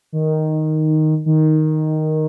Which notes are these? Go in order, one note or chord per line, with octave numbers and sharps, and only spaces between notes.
D#3
D#3